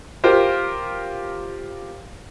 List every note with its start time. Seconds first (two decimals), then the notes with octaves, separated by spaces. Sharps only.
0.24 F4 G4 A#4 C5